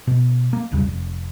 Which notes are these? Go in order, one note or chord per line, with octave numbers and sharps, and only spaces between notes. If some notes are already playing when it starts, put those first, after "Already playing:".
B2
A#3
B1 E2 C#3 G3
F1